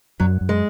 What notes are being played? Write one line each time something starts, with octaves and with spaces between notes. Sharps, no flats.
F#2 F#3
F#2
G#3